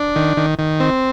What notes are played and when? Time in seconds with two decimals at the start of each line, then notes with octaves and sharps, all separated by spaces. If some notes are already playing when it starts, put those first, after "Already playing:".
Already playing: D4
0.16 D#3
0.37 D#3
0.59 D#3
0.80 C4